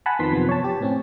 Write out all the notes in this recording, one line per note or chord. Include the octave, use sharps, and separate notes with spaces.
F#5 G#5 A5 B5
F2 D#3 F3 B3 C6 B6
F#2 C3 F3 B3
C#5 A5
G4
A2 C4 C#4